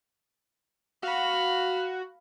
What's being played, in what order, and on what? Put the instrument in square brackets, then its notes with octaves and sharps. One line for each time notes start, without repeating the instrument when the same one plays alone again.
[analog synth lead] F#4 [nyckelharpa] F5 B5